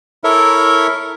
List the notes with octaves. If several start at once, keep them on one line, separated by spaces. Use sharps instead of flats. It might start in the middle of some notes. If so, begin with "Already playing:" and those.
E4 A4 A#4 C#5 E5